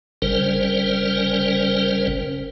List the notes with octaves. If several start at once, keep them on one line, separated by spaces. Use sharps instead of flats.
G1 C#3 G3 C#4 A#4 C5